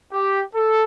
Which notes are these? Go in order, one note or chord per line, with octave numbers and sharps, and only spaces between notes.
G4
A4